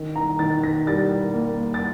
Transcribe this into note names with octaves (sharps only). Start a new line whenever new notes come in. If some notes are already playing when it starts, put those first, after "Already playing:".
Already playing: D#3
A#5
D#3 A6
A#6
G3 A6
A#3
A6